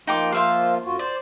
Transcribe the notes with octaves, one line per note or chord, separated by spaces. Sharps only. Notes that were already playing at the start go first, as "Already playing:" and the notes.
F3 A#3 D#4 F4 G5 D6
C5 E5 F5
F#2 F4 F#4
C5 D5